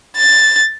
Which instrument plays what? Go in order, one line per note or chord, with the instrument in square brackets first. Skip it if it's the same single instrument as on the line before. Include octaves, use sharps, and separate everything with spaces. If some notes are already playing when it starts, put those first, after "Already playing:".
[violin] A6